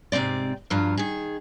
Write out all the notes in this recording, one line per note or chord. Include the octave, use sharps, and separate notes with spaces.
G#2 C3 G#3 C4 D5
G2 F3 F#3 F4
D#3 G#4